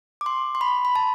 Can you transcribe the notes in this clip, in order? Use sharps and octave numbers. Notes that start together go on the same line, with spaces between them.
D6
C6
C6
B5
B5
A5